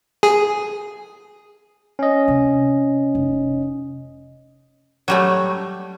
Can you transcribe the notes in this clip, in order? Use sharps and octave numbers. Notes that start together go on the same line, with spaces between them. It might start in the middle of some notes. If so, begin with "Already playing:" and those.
G#4
C#4 D#5
C3
F1
F#3 G3 A3